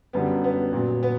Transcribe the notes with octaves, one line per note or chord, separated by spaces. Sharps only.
F#2 D3 G3 B3
B3
A#2 F#3
B3